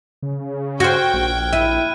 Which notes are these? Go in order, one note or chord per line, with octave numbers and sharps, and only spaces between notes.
C#3
F#4 C5 G5 F6 F#6 G#6
A#1
E4 D#7